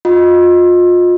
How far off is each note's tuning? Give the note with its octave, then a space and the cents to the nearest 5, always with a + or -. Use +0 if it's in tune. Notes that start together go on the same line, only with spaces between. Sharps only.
F4 +30 D#5 +0